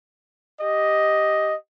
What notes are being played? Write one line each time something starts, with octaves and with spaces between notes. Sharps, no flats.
G4 D#5